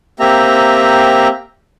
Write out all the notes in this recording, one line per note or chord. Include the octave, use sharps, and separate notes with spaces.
A#3 C4 G4 E5 A#5